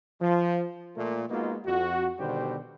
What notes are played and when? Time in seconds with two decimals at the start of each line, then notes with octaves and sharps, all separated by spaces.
0.21 F3
0.96 A#2 A3 A#3
1.30 G#3 A#3 B3 D#4 F4 F#4
1.66 F2 F#4
2.19 B2 D3 D#3 G3 G4 C5